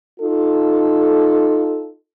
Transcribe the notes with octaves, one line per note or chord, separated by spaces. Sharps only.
D#4 F4 A4